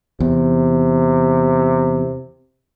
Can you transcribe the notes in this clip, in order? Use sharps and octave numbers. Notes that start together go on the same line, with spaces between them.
E2 C3